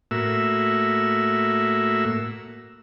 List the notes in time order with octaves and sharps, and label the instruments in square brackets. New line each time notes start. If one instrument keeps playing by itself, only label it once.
[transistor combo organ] A2 A#3 F#4 E5 E6